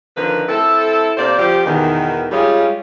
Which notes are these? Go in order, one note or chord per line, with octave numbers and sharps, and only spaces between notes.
D3 D#3 F3 A#4 B4
C4 E4 A4
C3 A#3 C5 D5
F3 C4 G4
E2 B2 D#3
G3 G#3 C#4 F4 G#4